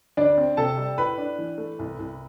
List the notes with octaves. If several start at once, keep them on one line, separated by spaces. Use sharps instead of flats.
D2 D4 D5
C4
C3 A4 A5
G3
A2 B4 B5
D4
E3
A3
C2
C2